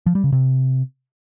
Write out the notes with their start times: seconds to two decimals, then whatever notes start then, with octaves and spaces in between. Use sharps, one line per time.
0.06 F3
0.15 G3
0.24 C#3
0.32 C3